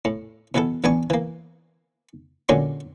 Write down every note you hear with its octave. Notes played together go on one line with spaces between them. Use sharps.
A2
B2 E3 B3 A4
A1 B3 D4 G#5 C#6
E3 A#3
A#2 D3 F#3 G#3 C#4 G4